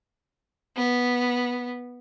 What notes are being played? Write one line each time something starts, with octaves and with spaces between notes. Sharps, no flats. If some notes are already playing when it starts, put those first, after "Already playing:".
B3